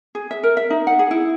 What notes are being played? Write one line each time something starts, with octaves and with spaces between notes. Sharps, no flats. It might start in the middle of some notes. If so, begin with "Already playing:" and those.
G#4
E5
A#4
E5
D#4
F#5
G#4
E4